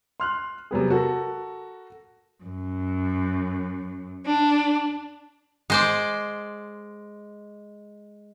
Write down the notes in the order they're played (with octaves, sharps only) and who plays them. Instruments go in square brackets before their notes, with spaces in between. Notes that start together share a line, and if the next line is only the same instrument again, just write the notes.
[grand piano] C6 F6 F#6
C3 F#3 B3 G#4
F#4 A4 A#4
[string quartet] F#2
D4
[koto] G#3 C5 D5